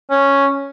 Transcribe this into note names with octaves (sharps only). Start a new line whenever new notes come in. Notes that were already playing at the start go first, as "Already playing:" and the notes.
C#4